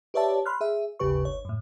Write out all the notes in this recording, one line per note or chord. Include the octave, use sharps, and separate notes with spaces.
G4 B4 C#5 D5 E5 A5
B5 C6 F6 F#6
G#4 E5
G#1 D#2 C#3 G4 B4 C#6
G1 C#5
F#2 A2